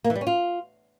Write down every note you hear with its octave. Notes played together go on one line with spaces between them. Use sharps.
A#3
E3
G3
C#4
F4